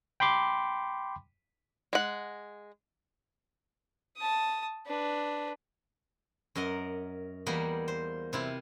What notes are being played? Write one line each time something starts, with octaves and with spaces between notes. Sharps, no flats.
G5 B5 C6 D6
G#3 F#5
A5 D#6
D4 B4
F#2 A#4 D#5 F#5
E2 G3 A#3 D#5 F#5 B5
C5
C3 E4 F4